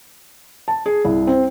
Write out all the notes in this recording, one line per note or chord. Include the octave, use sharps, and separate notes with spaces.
A5
G#4
C2
C4